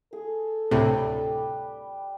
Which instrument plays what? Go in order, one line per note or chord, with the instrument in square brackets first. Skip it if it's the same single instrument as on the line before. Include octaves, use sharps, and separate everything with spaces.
[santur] G#4 [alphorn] A4
[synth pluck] D2 A2 C3 [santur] G3 B4 G5